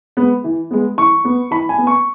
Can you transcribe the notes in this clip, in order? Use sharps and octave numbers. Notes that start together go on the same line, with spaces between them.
G#3 B3
E3
G#3 B3
E3 C#6
B3
E3 B5
G#5
B3
C#6